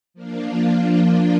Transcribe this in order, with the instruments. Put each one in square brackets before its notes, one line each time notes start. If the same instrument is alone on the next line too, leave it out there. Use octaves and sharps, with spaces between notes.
[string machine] F3 A#3 D4 F4